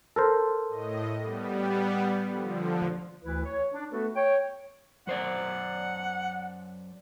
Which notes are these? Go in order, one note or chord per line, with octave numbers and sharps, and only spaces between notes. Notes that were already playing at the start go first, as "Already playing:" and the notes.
A4 A#4 C5
A2 D#5
G3 B3
D3 F3
D2 E3 E4 B4
C#5
D4
A3 B3 F#4 A4 B4
C#5 G5
F#2 C5 D5 F#5